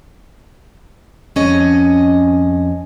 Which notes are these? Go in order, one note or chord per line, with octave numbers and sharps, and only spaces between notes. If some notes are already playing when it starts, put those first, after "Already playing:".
F2 C#4 D#5